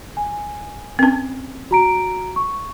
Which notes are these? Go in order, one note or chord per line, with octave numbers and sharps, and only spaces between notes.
G#5
C4 C#4
F#4 A#5 D7
C#6